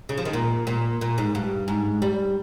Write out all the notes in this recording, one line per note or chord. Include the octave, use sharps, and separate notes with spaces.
C#3
F3
D#3
A#2
A#2
A#2
G#2
G2
G#2
G3